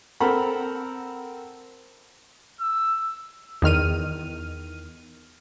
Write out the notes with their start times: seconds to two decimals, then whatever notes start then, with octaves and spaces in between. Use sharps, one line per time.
0.20 C4 A4 A#4 F#5 B5
2.60 E6
3.62 E2 D#3 F6 D#7